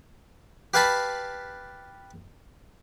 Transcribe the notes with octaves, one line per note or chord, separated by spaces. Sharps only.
G4 B4 F5 G#5 A5 B5